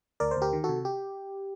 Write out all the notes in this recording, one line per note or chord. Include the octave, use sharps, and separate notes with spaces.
D2 A#4 D5
C5
D2 G4 A#4
D#3
C3 F#4 A4
G4